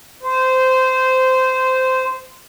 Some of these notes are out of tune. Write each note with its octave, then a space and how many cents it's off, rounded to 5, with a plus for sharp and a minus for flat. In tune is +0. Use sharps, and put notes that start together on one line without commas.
C5 -15